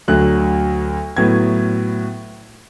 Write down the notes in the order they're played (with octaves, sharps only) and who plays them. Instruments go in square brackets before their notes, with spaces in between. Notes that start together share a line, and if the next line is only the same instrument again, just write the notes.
[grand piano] D2 D3 F#3 F#6
A2 F#3 B3 G#6